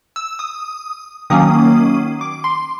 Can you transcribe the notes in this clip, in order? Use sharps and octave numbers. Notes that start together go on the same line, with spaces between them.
E6
D#6
D#3 F#3 A#3 C#4 D#6
D6
C6